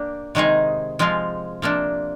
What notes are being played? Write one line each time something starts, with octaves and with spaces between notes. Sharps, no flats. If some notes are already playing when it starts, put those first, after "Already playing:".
Already playing: A#3 D4 G4
C3 D#3 G#3 D#4 G#4
F3 G#3 C4 F4
C3 F3 A#3 D4